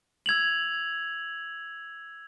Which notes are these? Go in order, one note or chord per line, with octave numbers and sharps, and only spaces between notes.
E6 G#6 F7 F#7